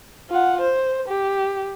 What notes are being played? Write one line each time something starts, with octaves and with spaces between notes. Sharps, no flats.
F4 F#5
C5
G4